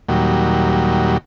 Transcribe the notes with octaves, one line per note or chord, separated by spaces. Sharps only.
D#2 A#2 F#3 G3